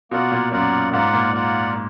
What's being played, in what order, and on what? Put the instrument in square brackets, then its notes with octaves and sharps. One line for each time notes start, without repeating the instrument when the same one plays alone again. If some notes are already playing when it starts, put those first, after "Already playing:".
[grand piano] B2 [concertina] A#3 F4 A#4 D5 F#5
[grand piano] A#2
[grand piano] F#2 [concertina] A#3 F4 A#4 D5 F#5
[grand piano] G#2 [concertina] A#3 F4 A#4 D5 F#5
[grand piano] A#2
[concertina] A#3 F4 A#4 D5 F#5